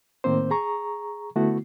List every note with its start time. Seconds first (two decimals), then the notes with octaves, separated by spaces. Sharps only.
0.24 A2 D#3 A#3 C4 C5
0.51 G#4 A#5 C#6
1.36 D3 A3 B3 E4 F#4